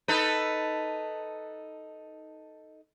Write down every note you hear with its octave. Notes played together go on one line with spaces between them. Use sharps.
D#4 A4 B4